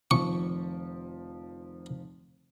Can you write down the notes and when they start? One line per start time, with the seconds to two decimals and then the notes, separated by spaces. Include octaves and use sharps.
0.11 F1 D#3 F3 C#6